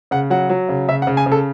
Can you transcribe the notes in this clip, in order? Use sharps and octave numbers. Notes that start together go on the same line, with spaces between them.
C#3 F#5
F#3 F#5
F#3
C#3
C#3 E5
F#5
C#3
G#5
C#3
A4